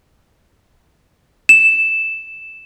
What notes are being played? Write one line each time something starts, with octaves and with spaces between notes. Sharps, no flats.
E7